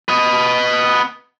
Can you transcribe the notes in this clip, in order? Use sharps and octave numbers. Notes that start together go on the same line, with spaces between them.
B4 D#5